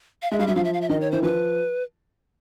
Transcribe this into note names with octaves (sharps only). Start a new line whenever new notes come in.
F5
G#3 E5
G3 F5
F#3 E5
F3 F5
E5
F5
E5
D#3 D#5
C#5
E3 C5
F3 B4